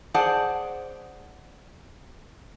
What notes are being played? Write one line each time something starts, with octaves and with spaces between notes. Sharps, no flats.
G#4 C5 D5 F#5 A5